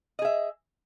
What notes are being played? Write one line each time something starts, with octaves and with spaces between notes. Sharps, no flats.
G#4 D#5 E5